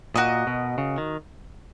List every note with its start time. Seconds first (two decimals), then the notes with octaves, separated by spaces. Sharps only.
0.16 A#2 F#4 A#4 D#5
0.47 B2
0.78 C#3
0.98 D#3